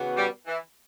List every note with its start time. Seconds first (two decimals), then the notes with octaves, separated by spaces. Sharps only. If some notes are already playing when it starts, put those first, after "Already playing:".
Already playing: C#3 E3 B3 F#4
0.15 G3
0.47 E3